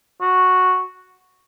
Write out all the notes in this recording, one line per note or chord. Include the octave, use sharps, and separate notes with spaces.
F#4